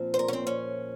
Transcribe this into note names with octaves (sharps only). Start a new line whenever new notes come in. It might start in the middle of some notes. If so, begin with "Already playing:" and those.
Already playing: A#2 F3 C4
C5
A#4
C#4
C4
C#4